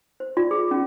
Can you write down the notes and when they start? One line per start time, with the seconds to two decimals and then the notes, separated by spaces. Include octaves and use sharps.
0.20 C5
0.37 F4 D5
0.51 G#4
0.71 C#4 F4